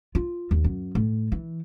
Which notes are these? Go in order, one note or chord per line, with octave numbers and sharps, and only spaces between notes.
F4
D#2
F#2
A2
E3